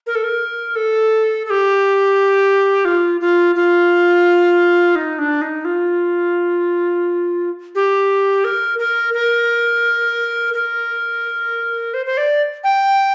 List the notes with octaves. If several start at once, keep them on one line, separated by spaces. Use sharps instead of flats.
A#4
A4
A#4
A4
A4
G4
F4
F4
F4
D#4
D4
D#4
F4
G4
A#4
A#4
A#4
A#4
C5
C5
D5
G5